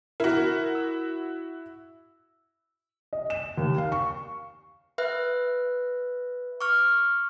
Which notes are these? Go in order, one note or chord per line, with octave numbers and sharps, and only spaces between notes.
E4 F#4 A#4
E6
D#5
E7
D#2
F5
C#6
B4 E5 F#6
C#6 D6 F6